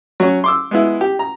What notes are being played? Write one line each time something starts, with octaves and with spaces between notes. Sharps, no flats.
F#3 C#4
C6 D6 E6
G#3 B3 E4
G4
A#5